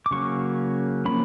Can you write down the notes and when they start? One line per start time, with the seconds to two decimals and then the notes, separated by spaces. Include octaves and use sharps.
0.06 D6
0.11 C#3 F#3 A#3 C#4 C#6
1.05 F3 A#3 C#4 B5